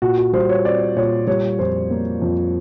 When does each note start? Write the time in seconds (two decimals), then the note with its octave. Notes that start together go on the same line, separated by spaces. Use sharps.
0.02 A#2 F#4
0.18 F#4
0.33 G3 C5
0.49 C#5
0.65 C4 D5
0.96 A#2 C#5
1.27 G3 C#5
1.59 F2 C5
1.90 A#3
2.22 F2